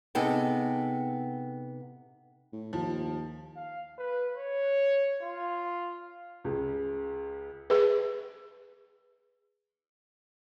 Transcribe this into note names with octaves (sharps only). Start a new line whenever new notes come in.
C3 B3 D#4 G#4 A4 G5
A2
D#2 F3
F5
B4
C#5
F4
C#2 C#3 G#3
G#4 B4